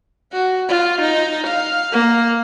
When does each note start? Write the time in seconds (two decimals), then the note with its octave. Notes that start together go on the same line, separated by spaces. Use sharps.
0.33 F#4
0.69 F4
1.02 D#4
1.47 F5
1.92 A#3